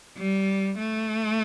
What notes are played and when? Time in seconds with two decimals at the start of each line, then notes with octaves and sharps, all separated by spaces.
0.18 G3
0.78 A3